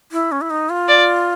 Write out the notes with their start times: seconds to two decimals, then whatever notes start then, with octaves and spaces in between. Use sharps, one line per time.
0.12 E4
0.32 C#4
0.41 E4
0.50 D#4
0.70 F4
0.89 D5